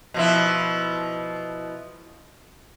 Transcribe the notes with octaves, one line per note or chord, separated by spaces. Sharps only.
B2 F3 E4